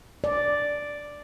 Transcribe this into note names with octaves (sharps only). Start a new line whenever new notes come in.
D5